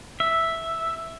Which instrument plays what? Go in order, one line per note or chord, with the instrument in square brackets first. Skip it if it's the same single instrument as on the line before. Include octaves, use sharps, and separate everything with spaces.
[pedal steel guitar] E5